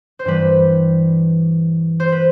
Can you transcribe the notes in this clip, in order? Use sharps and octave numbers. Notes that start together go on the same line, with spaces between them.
C5
G2 E3 G3 B4
C5
B4